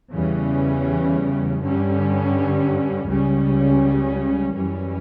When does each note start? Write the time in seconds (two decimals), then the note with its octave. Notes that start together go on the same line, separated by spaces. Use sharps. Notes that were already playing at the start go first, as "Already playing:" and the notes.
0.14 E2 C#3 E3 G3 C#4
1.61 G2 D3 G3 C#4
3.08 C#2 C#3 G3 C#4
4.55 F#2 E3 G3 C#4